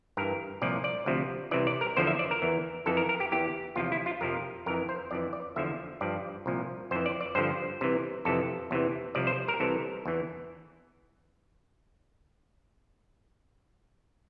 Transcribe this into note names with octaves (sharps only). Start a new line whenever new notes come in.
G2 E3 A#4
C2 A#2 F3 D5
D5
D2 C3 F3
C2 C3 E3 D5
D5
A#4
E2 D3 F3 C5
E5
D5
A#4
E2 E3
F2 E3 A4
A#4
A#4
G4
E2 E3 G4
E2 C3 F3 F4
E4
F4
F2 C3 F3 A#4
F2 E3 A#4
C5
F2 E3 D5
D5
E2 D3 F3 E5
G2 F3 D5
C2 A#2 F3
F2 E3 C5
D5
D5
G2 D3 F3 C5
C2 C3 E3
F2 C3 E3 A4
E2 C3 E3
C2 C3 F3 D5
C5
A#4
C2 C3 E3 A4
E2 E3